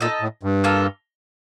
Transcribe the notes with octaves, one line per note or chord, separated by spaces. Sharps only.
A#2 D#4 A4 D#5
A2
G2
A#3 F4 A4